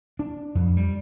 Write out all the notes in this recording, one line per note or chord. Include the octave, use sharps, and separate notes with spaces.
D4
F2
G3